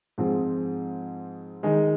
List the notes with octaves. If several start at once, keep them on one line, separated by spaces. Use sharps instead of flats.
G#2 F3 C4 G#4
D#3 G#3 D#4 G#4